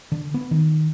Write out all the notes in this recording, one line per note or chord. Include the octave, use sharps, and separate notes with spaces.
D3
B3
D#3